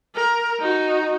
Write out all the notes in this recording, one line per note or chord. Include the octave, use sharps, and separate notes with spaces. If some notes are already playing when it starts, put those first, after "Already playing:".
A#4
D#4 F#4